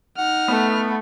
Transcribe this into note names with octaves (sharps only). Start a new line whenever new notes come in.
D#4 F#5 F6
A3 B3